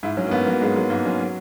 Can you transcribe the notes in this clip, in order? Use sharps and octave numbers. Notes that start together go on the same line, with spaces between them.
G#2 E4
F#3 C#4
A#3
G#2 B3
F#3 A#3
G#2 G#3
F#3 G#3
G#2 A#3
F#3 C#4
F#3